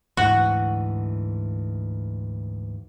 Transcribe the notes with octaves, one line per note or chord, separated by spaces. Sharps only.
D2 G#2 E3 F#4